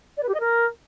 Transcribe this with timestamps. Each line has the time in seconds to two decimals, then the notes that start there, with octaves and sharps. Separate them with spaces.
0.17 D5
0.22 B4
0.28 G4
0.34 D#5
0.40 A#4